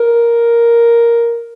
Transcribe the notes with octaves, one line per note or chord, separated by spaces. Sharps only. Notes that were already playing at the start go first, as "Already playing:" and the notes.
Already playing: A#4